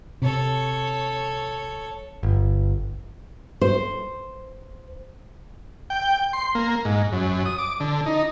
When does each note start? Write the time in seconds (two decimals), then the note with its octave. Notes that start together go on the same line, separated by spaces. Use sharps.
0.22 C3 A4 C#5
2.23 G1
3.61 C5
5.90 G5
6.33 C6
6.55 A#3
6.85 G#2
7.12 F#2
7.45 D#6
7.58 D6
7.80 D3
8.06 D#4